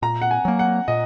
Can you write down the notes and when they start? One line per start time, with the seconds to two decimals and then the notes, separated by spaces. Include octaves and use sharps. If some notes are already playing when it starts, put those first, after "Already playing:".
0.02 A#2 A#5
0.22 F#5
0.31 G#5
0.45 F#3 A#3
0.59 F#5
0.88 A#2 D#5